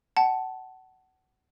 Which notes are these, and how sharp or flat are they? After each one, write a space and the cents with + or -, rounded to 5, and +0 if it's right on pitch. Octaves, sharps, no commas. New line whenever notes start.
F#5 +25 A5 -5